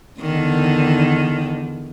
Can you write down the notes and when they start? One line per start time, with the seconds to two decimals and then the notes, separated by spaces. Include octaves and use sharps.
0.20 E2 D3 D#3